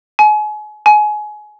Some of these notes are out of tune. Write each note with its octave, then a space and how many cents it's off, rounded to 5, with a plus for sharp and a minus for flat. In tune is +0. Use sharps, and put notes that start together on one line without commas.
G#5 +35
G#5 +25